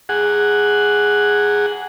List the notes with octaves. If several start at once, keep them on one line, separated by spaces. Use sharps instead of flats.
G#4 F#5